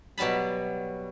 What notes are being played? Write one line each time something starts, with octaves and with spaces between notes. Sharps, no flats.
B2 F#3 G3 A5 B5